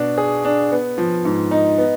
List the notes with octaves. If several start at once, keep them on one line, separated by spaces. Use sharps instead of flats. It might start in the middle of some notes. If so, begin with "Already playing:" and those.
Already playing: B2 D4
G#4
D4
B3
F3
G#2
D#4
B3